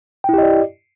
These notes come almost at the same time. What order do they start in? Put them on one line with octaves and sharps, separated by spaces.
G5 E4 G4 D#5 D5